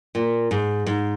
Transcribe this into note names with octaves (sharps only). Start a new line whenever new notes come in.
A#2
G#2
G#2